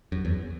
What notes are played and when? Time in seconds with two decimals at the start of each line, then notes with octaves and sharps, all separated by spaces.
0.12 F#2
0.25 E2